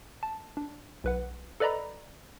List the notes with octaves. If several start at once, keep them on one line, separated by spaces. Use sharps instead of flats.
A5
D4
B1 B4 F#5
A4 B4 D5 D#5 A#5 B5